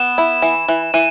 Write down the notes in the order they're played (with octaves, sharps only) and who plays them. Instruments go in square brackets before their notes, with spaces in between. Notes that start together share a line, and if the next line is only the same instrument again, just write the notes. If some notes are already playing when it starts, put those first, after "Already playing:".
Already playing: [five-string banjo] B3 [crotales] E7
[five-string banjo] E4
E3
E3
[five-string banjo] E3 [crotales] D#7